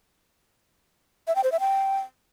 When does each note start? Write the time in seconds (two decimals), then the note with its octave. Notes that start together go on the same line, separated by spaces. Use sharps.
1.27 E5
1.36 G5
1.44 C5
1.52 E5
1.60 G5